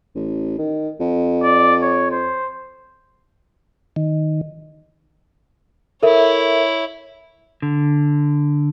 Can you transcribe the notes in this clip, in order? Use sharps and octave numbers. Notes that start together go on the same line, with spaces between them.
A1
D#3
F2
D5
C#5
C5
D#3
E4 A4 A#4 C#5 E5
D3